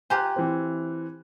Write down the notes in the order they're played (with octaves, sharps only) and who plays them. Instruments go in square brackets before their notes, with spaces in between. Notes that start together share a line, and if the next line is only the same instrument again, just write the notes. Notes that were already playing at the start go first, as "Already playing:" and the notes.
[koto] F4 G4 C5 [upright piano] G#5 A#5 F#6
[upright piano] E3 C4